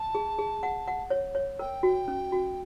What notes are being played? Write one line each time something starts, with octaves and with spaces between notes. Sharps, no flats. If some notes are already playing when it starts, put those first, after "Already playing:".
Already playing: A5
G#4
G#4
F#5
F#5
C#5
C#5
A#4 G5
F#4
C#4
F#4